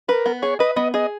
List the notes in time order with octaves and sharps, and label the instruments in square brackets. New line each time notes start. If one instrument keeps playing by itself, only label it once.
[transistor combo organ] A#4 [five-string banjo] B4
[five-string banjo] B3
[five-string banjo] G#4 [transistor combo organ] C#5
[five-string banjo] B4 [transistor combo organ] D#5
[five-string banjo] B3 [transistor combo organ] D#5
[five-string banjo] G#4 [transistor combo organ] D#5